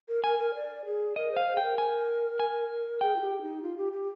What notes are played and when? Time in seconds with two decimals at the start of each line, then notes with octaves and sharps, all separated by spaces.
0.08 A#4
0.24 A#4 G#5
0.39 A#4
0.55 D5
0.85 G#4
1.16 A#4 D#5
1.31 C5
1.37 F5
1.47 C5
1.55 G#4 G5
1.62 A#4
1.78 G#5
2.39 G#5
3.01 G#4 G5
3.16 F4
3.21 G4
3.41 D#4
3.62 F4
3.78 G4
3.93 G4